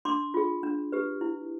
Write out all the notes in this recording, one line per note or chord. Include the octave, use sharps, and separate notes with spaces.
D4 C6 D6
F4 G#4
D4
G4 B4
E4